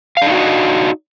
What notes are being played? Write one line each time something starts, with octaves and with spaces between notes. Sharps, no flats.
D4 D#4 F#4 D#5 F5